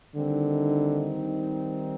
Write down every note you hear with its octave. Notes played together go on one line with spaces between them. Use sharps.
D3 D#3 G3 C4 D#4